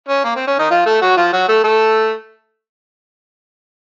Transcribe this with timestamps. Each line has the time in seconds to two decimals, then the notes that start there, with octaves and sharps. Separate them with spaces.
0.09 C#4
0.24 A#3
0.36 C4
0.47 C#4
0.59 D#3 D#4
0.70 F3 F4
0.86 A3 A4
1.02 F#3 F#4
1.17 F3 F4
1.33 F#3 F#4
1.48 A3 A4
1.64 A3 A4